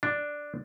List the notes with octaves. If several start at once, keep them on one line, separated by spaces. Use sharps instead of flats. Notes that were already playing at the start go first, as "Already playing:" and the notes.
D4